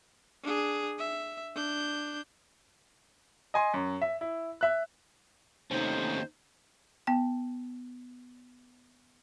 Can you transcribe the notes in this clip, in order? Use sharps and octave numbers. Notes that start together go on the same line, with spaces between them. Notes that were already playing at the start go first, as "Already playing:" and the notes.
D4 G#4
E5
D4 G6
D#5 G#5 C6
F#2
E5
E4
E5 F#6
D#2 C3 A3 C#4 D#4 C5
B3 G5